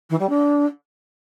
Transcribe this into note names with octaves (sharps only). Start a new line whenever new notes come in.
E3
G3
D4